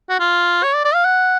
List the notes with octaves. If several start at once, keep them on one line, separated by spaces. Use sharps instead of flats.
F#4
F4
C#5
D5
D5
F5
F#5